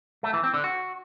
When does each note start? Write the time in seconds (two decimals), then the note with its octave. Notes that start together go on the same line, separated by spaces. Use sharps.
0.23 A3
0.33 E3
0.43 C4
0.54 D3
0.64 F#4